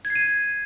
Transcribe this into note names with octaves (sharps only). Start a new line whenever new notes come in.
G#6
C7
D#7
G#6